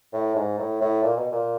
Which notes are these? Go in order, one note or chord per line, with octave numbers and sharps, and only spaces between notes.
A2
G#2
A2
A2
A#2
B2
A#2